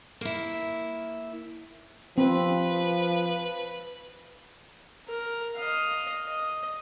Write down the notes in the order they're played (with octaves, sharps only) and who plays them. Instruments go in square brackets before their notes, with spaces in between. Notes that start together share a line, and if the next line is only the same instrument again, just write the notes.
[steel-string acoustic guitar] A#3 E4
[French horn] F3 [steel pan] C4 [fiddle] B4
[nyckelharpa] A#4
D#5 F5
D#5